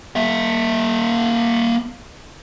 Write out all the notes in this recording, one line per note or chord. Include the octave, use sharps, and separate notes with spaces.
A#3 E5